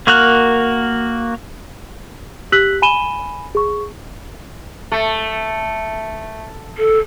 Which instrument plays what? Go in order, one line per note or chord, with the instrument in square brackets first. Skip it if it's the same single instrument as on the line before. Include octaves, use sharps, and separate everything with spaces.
[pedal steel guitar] A#3 F#4 A#4 F#6
[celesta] G4 E6 F#6 B6 F#7
G#5 B5 D#7 E7 G7
G#4 C#6
[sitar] A3
[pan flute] A4